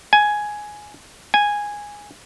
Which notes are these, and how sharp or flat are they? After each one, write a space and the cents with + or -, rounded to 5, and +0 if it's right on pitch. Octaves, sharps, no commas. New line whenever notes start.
G#5 +5
G#5 -10